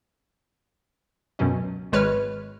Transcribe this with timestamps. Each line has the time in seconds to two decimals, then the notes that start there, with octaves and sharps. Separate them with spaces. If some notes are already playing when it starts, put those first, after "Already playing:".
1.39 C#2 F#2 B2 F#3 C#4
1.92 G#1 G#3 B4 C#5 F6